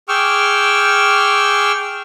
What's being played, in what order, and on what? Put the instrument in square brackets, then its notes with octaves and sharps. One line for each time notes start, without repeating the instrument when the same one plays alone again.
[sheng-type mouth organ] G#4 G5 C#6 D6 E6 F6